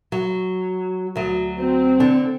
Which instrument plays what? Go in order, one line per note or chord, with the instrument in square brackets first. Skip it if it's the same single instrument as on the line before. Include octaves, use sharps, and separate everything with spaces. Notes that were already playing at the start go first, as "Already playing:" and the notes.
[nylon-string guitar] F#3
D2 F#3
[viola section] C4
[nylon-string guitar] D3 D4